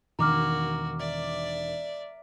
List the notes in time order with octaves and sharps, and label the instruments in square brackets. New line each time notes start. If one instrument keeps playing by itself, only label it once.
[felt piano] E1 D#3 [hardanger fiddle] A#3 F#4 [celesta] A#5 D6 F6
[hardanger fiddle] D5 E5